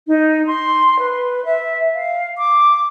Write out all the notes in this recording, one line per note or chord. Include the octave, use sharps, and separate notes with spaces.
D#4
C6
B4
E5
F5
D6